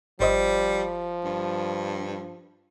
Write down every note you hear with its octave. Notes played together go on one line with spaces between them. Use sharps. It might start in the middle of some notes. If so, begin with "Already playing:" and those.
G1 F3 G3 C5 D#5
G2